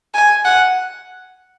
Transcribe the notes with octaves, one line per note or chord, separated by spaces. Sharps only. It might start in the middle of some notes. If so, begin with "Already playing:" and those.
G#5
F#5